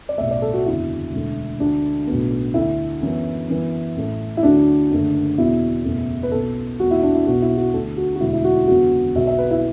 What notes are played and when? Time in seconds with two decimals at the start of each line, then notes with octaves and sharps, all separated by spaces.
0.09 D5
0.18 B1 A2 A3 E5
0.31 D5
0.42 A4
0.54 F#4
0.65 F#1 E2 D3 E4
1.12 E1 D2 D3 A3
1.60 D2 D3 F#3 A3 D4
2.07 B1 A2 F#3 B3
2.54 D2 D3 A3 E4
3.02 F#2 E3 B3
3.48 F#2 E3 B3
3.96 A1 A2 A3
4.37 E4
4.43 D2 D3 F#3 A3 D4
4.91 F#1 F#2 D3 A3
5.38 E2 B2 F#3 E4
5.84 F#1 E2 B2 A3
6.23 B4
6.32 B1 B2 B3 A4
6.80 E2 B2 A3 F#4
6.91 E4
7.03 D4
7.15 E4
7.26 B1 B2 B3 F#4
7.42 E4
7.57 F#4
7.74 D2 D3 A3 A4
7.97 F#4
8.16 F#4
8.20 E1 D2 D3 F#3 B3 E4
8.33 E4
8.44 F#4
8.56 E4
8.68 F#1 E2 D3 F#3 B3 F#4
9.15 B1 B2 F#3 B3 E5
9.27 E5
9.39 B4
9.51 E4